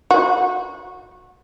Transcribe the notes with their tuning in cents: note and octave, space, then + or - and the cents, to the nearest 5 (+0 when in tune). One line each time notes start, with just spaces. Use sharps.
F#4 -25